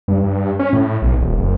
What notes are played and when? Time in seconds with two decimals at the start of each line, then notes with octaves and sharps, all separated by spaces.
0.08 G2
0.23 G2
0.59 C#4
0.73 A2
1.02 B1
1.21 D#1
1.38 F#1